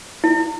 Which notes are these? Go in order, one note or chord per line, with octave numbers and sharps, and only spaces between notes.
E4